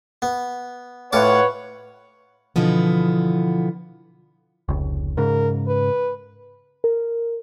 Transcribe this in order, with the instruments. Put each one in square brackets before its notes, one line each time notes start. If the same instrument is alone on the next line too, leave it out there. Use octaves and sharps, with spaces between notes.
[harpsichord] B3
[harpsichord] A2 F4 D6 [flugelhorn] B4 [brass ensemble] C#5 F#5
[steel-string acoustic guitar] B2 D3 E3 F3 B3
[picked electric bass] F1 C#2
[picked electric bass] G#2 C#3 [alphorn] A#4
[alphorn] B4
[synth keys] A#4